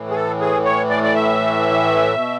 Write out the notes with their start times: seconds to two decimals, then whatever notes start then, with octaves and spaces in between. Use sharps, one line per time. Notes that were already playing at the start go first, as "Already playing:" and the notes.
Already playing: A2 E3
0.10 G#4
0.14 A4
0.41 G#4
0.65 C#5
0.90 D5
1.03 D5
1.15 E5
2.15 B2